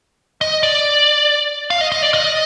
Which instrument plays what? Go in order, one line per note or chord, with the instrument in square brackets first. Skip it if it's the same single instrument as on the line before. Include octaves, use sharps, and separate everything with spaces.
[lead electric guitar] D#5
D5
F5
D#5
D#5
D5
D#5